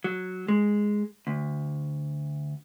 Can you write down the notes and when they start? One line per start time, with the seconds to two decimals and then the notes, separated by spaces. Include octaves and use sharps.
0.04 F#3
0.48 G#3
1.27 D2